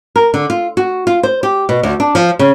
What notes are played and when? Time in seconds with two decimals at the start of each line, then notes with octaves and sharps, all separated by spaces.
0.16 A#4
0.34 D3
0.50 F4
0.77 F#4
1.07 F4
1.23 C5
1.43 G4
1.69 B2
1.83 D2
2.00 D4
2.15 F3
2.39 C#3